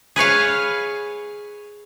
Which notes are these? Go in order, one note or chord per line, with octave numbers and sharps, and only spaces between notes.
G#4 B4 C#5 F5